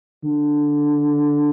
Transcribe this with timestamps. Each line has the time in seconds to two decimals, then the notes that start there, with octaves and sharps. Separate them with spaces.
0.24 D3